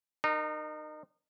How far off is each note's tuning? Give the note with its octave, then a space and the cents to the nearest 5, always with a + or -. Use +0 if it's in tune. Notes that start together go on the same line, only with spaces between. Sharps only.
D#4 -30 A#4 +0